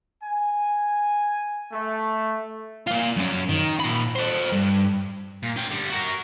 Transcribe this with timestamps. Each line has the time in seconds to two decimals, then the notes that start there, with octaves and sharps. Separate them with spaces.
0.23 G#5
1.72 A3
2.87 A#3 F4
3.17 F#2 C#4
3.49 D#3
3.80 A#2 B5
4.16 A4 C5
4.52 G2
5.43 A#2
5.56 C#4 G5
5.70 D3 G3
5.90 F#4 A#4